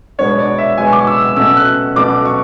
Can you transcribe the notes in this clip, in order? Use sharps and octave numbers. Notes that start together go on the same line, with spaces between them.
B2 G#3 B3 D4 C#5
D5
E5
B2 G#3 B3 D4 G#5
C#6
D6
E6
E6
B2 A3 C#4 E6
F#6
B2 A3 C#4 D6
C#6